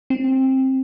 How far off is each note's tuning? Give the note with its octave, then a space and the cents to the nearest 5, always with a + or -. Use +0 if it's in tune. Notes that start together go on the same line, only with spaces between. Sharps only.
C4 +15